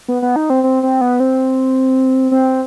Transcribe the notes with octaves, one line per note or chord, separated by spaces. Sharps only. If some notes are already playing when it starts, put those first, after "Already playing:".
B3
B3
D#4
C4
C4
C4
B3
C4
C4